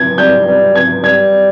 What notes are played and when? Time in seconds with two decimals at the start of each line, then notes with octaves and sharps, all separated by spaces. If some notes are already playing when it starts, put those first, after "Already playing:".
Already playing: G#6
0.18 G3 G6
0.48 G3
0.75 G#6
1.04 G3 G#6